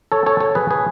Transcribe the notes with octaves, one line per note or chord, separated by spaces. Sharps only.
A4 C#5
A4 C#5
A4 C#5
G#4 B4
G#4 B4